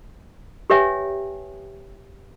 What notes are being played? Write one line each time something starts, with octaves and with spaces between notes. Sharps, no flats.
G4 B4 C#5 E5 G5 G#5